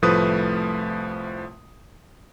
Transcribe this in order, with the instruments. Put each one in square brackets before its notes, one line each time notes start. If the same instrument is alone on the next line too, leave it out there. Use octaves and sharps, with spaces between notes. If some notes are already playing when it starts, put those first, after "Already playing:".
[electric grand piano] C2 A2 F3 A3 B4 D#6